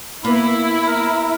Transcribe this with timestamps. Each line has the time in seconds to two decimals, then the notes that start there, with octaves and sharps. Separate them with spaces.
0.24 A#3 B3 E4 B5
0.87 A#4